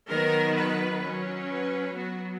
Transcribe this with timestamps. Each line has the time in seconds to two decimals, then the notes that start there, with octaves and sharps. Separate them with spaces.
0.09 D#3 F#3 B3 A#4
0.55 B4
1.02 F#3 C#4
1.48 B4
1.93 F#3 B3 F#4